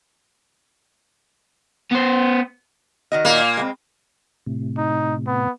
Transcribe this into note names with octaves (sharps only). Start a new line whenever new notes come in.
B3 C5
D#3 F#4 D#5
A#2 A#3
G#3 B3 C4
A2 C3
D#4
B3